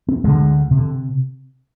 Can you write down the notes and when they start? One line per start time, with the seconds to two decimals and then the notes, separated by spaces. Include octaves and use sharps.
0.08 C4
0.24 D2 D3 G#3
0.71 C3
0.77 D3